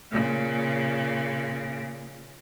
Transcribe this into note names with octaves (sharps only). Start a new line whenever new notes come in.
A#2 C#3